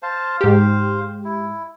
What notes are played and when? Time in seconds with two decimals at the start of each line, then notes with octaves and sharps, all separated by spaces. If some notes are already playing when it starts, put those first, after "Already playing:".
0.03 C5 F5 A5
0.41 G#2 G4 C5 F5
1.25 E4